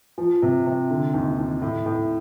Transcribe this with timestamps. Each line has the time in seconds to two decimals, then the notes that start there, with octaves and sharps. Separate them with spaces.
0.18 F3
0.42 C3
0.66 C3
0.90 D3
1.14 D#2
1.38 D#2
1.62 A2
1.86 A2